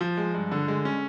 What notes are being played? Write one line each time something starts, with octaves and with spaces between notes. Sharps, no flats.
F3
G#3
G2
D3
G#3
C#4